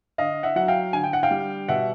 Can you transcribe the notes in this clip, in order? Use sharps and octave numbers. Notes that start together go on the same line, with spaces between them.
D3 D#5 F5
E5 F#5
F#3 F#5
F5 G5
D3 G#5
G5
F#5
F5 G5
G3
B2 E5 F#5